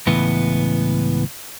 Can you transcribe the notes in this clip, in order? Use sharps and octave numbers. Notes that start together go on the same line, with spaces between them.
C#2 A2 E3 B3